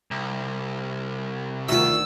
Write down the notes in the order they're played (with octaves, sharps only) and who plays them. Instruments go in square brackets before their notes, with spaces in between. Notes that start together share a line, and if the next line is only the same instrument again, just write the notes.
[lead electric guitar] C2
[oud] D2 D#3 F#4 [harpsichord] F4 E5 [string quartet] E6